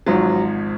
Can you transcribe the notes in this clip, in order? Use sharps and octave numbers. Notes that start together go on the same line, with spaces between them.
G#1 G#2 F3 F#3